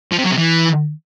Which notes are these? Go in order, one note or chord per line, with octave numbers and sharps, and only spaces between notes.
F3
C3
F#3
C3
E3